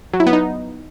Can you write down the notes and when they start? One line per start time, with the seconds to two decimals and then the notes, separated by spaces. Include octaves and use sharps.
0.13 F#3
0.20 E4
0.27 B3
0.33 D#4